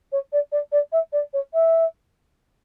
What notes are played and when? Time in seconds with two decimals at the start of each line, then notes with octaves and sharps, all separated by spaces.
0.12 C#5
0.32 D5
0.52 D5
0.72 D5
0.92 E5
1.12 D5
1.33 C#5
1.53 E5